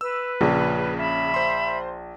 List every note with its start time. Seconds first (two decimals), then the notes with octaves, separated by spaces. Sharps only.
0.01 B4 E6
0.41 A#1 C#3
0.98 E5 B5
1.34 C5 C6